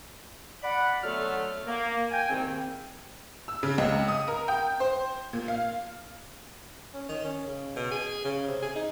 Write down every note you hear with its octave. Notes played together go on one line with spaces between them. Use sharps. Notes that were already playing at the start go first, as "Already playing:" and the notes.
D5 F#5 B5
D3 F#3 A3 B3 A4 F6
A#3
G5 G#5
C2 G#2 D#3 A#3 C4
E6
C#3
C#2
D#6
A#4
G5
C5
A#2
F5
C#4
D#3
C#4
C#3
B2
G#4
C#3
C3
G#4
D#4